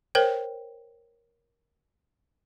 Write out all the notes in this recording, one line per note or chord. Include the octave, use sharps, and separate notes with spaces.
A#4 C5 C#5 G5